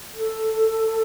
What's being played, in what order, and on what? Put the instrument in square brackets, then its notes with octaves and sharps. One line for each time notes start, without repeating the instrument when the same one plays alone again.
[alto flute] A4